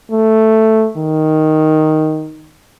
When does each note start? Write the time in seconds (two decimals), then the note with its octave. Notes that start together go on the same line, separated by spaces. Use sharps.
0.11 A3
0.97 D#3